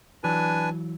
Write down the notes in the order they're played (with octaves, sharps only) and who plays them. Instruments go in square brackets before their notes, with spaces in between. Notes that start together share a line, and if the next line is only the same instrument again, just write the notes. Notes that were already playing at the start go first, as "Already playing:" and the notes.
[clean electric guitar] E3 F#3 [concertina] D4 B4 G#5